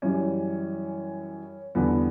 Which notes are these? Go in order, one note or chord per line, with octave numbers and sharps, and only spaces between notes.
F#2 E3 G3 C#4
E2 D3 G3 B3